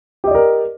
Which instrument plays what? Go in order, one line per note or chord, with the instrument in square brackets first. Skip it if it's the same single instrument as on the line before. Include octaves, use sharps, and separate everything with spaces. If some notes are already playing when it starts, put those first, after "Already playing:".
[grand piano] G4
D#5
D5
A#4